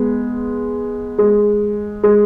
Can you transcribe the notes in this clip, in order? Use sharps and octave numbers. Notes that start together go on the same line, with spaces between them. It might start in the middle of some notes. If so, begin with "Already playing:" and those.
Already playing: G#3 B3
G#3
G#3